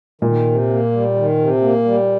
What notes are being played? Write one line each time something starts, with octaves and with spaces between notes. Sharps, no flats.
A#2 D#3
C3
A#3
G3
D#3
C3
A#3
G3